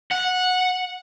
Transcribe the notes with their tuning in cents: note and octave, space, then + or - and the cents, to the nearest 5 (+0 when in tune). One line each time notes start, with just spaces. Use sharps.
F#5 -15